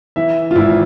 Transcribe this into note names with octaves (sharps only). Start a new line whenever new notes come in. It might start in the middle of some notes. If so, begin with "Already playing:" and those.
E3 E5
F4
G#1 E4